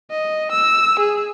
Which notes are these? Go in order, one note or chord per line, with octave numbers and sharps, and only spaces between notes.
D#5
E6
G#4